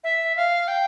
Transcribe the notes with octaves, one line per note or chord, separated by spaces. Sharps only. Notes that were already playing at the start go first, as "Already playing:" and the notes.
E5
F5
G5